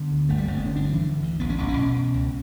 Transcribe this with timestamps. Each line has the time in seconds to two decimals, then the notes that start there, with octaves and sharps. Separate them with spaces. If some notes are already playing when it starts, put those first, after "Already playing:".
Already playing: D3 B3
0.11 D2
0.29 G1 A3
0.38 G3
0.48 G1 A3
0.57 B3
0.66 D3 C#4
0.76 D4
0.84 G2
0.94 E3
1.03 D3
1.22 D2
1.40 A1 B3
1.49 C#4
1.58 A1 B3
1.68 C#4
1.77 B2
1.96 B2
2.14 C#2